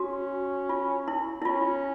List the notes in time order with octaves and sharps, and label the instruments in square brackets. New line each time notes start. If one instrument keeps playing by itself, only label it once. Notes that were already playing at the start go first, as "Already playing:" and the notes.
Already playing: [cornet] C#4 [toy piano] F#4
[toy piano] F4
E4
E4
[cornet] C#4 [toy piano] F4